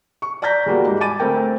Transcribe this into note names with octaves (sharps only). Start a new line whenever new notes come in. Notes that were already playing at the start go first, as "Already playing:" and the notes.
C#6
D5 A5 A#5 G6 A#6 B6
E2 G3 A#3 F#4
G#2 G3
G#5 A5 B5 D6 A6 D#7
D2 A3 C4 A#4 G5